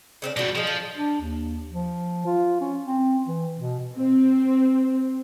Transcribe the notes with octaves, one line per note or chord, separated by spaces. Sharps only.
C#3 C4 D4
B2 G3 D4 F#4
F3 G#4 D#5
A4
D4
D#2
F3
F4
C#4
C4
E3
B2
C4